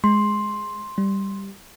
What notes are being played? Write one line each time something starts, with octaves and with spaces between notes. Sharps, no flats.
G#3 C6
G3